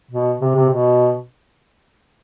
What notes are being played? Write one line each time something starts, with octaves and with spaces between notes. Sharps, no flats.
B2
C3
C3
B2